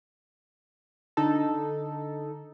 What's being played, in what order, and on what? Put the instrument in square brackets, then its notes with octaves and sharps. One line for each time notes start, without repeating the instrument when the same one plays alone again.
[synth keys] D3 D#4 A4